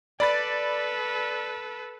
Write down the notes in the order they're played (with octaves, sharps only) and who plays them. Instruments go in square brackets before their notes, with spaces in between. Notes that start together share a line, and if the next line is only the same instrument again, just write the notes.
[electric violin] A4 B4 [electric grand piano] D5 B5 A6